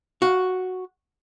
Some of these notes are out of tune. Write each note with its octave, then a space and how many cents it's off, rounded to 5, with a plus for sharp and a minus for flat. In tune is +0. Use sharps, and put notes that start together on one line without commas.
F#4 +0 F5 +25